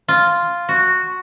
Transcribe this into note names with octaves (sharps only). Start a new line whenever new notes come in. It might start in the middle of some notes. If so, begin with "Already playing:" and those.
F4
F#4